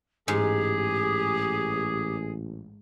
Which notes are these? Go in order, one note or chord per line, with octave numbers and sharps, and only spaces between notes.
A1 G#2 G4 G#4